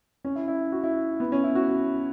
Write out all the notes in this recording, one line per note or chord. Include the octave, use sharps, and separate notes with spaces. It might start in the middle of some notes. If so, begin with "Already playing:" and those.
C#4
E4
E4
F#4
E4
B3
C#4
E4
F#4
F#4